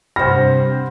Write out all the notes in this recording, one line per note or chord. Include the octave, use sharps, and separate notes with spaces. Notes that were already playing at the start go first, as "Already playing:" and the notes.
G2 C3 C5 F#5 B5 F6 A#6